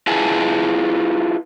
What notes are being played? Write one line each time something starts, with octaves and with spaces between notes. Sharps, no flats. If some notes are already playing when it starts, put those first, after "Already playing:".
E4 F4 G#4 B4 G#5 A5